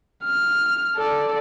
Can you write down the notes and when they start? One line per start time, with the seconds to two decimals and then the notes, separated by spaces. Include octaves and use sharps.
0.25 F6
0.96 A4 D5